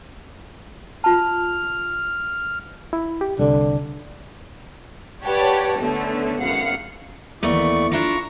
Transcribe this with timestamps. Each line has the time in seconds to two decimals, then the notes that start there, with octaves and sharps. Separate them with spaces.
1.04 F4 A5 F6
2.93 E4
3.21 G4
3.39 C2 D3
5.24 G4 B4 C#5 D5 F#5 A5
5.79 D3 A3 B3 C#4
6.40 G#1 F#2 F5 F#5 C#7
7.43 D#2 E3 A3 B3 D5 C#6
7.92 D4 E4 F4 A#5 C#6